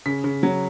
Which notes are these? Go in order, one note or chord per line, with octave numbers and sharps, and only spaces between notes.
C#3 B6
C#3
F#3